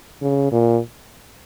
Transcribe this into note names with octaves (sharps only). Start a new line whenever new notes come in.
C#3
A#2